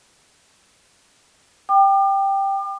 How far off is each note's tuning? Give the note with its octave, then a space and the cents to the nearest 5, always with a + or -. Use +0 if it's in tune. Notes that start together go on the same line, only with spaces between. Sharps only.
G5 +0 D6 +40